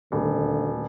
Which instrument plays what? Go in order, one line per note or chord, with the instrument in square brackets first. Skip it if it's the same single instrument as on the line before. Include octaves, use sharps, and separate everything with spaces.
[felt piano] D#1 [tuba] D2